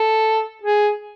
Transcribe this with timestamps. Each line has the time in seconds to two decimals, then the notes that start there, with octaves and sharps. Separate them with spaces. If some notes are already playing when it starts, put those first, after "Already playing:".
Already playing: A4
0.63 G#4